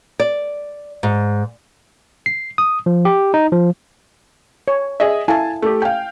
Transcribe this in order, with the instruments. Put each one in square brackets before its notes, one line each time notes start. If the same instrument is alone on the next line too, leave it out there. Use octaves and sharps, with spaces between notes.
[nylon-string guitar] D5
G#2
[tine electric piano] C7
D#6
F3
G4
D#4
F3
[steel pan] C#5
[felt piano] G#4 D#5 E5
[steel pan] E4 A4 F5 [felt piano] G#5 A5
[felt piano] A3 G4
[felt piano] F5 G5 [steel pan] G#5